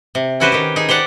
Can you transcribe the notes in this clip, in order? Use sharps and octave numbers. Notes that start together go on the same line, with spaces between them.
C3
C#4 E4 F#4 G4 B4 C5
D#3 G4
D#4 G#4
G4 C5 D5 F#5